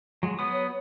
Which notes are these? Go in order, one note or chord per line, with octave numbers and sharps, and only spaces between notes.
F#3 G#3
F#3 B3 D#6
C#5